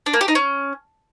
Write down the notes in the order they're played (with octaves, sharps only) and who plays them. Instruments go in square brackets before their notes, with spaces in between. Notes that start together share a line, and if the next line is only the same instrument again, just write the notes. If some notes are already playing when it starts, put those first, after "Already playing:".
[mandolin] D4
A#3
G4
D#4
C#4